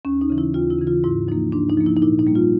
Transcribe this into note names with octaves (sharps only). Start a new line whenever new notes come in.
D#2 C#4
D#4
C#3 E3
E4
D#2 F4
E4
C#3 E3
F4
G#2 E4
F3 A#3 D#4
G#2 D4
D#4
F3 A#3
E4
D#4
A#2 E4
D#4
G3 A#3
F4